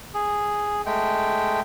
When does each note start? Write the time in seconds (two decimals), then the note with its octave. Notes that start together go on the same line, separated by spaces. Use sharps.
0.14 G#4
0.86 G#3 A3 G5